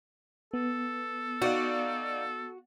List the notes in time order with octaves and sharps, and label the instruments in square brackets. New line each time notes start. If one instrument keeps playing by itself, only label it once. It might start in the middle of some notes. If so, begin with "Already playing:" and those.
[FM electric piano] B3 [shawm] A4
[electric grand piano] D#4 D5 F5 [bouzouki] F#4